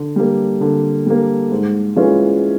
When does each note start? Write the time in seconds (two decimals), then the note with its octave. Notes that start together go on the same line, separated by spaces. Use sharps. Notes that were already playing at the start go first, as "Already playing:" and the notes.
Already playing: D3
0.16 G3 A#3
0.61 D3
1.06 G3 A#3
1.51 G#2
1.96 E3 G#3 C#4 F4